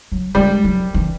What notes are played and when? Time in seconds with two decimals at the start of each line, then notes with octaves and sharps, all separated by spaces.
0.12 F#3
0.35 G3 G#3
0.64 F#3
0.94 E3